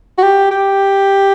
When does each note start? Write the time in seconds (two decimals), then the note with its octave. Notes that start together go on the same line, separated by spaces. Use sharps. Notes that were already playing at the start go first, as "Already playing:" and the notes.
0.18 F#4
0.23 G4
0.51 G4